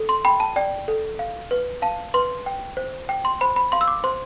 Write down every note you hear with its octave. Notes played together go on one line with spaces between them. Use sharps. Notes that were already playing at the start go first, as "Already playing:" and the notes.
Already playing: A4
C6
G5 B5
A5
D5 G5
A4
F5
B4
F5 A5
B4 C6
G5
C5
G5
C6
C5 B5
B5
F5 C6
E6
D6
C5 C6